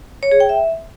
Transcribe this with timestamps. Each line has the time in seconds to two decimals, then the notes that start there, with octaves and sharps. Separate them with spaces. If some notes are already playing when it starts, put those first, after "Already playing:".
0.23 C#5
0.32 G#4
0.40 G5
0.49 E5